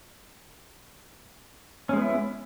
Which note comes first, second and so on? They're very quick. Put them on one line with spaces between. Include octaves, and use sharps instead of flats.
C#4 G#3 B3 E4